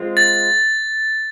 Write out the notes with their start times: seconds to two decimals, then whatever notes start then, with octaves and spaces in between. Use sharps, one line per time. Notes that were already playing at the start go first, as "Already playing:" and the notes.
Already playing: G#3 C4 F4
0.17 A6